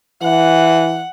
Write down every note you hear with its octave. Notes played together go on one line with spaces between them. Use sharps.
E3 F#5